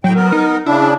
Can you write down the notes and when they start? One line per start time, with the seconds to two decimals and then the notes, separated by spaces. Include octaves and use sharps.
0.04 A2 F#3 G5
0.16 B3 A#4
0.32 D#4
0.66 C#3 D4 E4